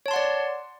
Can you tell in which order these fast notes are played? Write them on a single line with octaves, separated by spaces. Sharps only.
C#5 A5 C6 F#5 D5